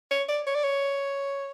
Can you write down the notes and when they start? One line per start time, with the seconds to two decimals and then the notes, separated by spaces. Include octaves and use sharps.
0.11 C#5
0.28 D5
0.47 C#5
0.55 D5
0.64 C#5